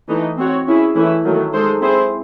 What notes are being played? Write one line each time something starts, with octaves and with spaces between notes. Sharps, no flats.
E3 A3 D#4
C4 F#4 C#5
C#4 E4 G#4
E3 A3 C#4 E4
D#3 F#3 A3
G#3 D#4 A4 C5
C4 E4 G#4 C5